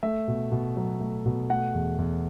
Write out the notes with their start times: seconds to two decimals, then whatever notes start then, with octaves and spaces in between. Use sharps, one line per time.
0.03 A3 E5
0.28 B2
0.52 B2
0.76 F#3
1.00 A3
1.26 B2
1.50 A3 F#5
1.74 E2
1.98 E2